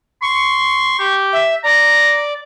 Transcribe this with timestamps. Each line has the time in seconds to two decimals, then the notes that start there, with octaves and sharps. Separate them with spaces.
0.22 C6 C#6
0.99 G4
1.33 E5
1.64 D5 A#5